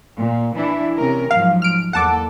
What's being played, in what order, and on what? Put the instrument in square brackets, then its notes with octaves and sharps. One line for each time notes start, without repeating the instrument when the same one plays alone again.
[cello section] A#2
E3 D4 E4
C3 C#4 A#4
[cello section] G#2 F3 F#3 [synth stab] F5
[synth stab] F6 D7
[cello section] E2 A#3 A4 [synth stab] F#5 A5 D6